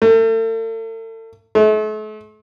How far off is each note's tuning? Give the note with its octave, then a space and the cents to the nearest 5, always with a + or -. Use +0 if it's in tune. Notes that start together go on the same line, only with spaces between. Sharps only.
A3 +40
A3 -40